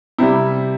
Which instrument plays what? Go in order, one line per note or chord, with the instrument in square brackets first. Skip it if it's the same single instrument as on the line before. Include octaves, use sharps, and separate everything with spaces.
[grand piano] C3 [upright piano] G3 C4 E4